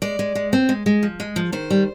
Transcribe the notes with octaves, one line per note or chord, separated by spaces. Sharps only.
G#3 D5
G#3
G#3
C4
G#3
G#3
F3
G#3
F3
D#3 C5
G3